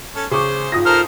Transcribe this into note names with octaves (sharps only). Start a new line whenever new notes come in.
C#4 A4
C#3 C5 C#6 D6
G#1 F4 D#6 A#6
A4 A#4 C5 F6